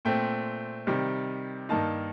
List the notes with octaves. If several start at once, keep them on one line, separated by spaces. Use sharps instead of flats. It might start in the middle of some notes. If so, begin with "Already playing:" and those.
A#2 A3 C4 G5
C3 D#3 G3
G2 D#3 A#3 D#4 A5